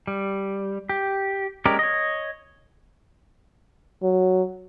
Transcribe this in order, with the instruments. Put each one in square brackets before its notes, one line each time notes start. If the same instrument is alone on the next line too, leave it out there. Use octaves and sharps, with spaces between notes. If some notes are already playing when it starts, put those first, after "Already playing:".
[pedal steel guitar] G3
G4
G#3 C#4 G4 A#4 D5
C#5 D#5
[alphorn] F#3